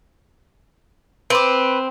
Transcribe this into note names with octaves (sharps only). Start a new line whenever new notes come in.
C4 B4 D6